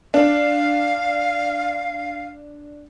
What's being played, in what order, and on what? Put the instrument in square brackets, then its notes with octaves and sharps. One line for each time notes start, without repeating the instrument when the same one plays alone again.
[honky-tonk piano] D4 [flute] F5